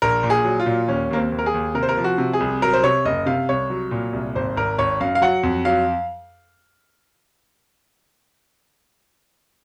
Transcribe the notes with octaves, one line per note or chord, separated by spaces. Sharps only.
A#1 A#4
A#2
G#4
F#3
F4
A#2
D#2 C#4
D#2 A#3
C4
D#2
A#4
G#4
D#2
C3 A#4
C5
A#4
F3
F#4
C3
G#4
C2
F#3 A#4
C5
C3 C#5
F#1 D#5
C3 F5
C2 C#5
F#3
A#2
C2
G#1 C5
G#1 A#4
G#1 C#5
F#2 F5
F5
F#3 F#5
F2
F#3 F5